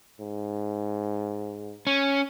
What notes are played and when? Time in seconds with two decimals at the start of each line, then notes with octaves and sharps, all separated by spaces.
0.20 G#2
1.87 C#4